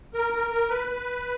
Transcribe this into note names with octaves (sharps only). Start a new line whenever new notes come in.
A#4
A#4
A#4
B4
B4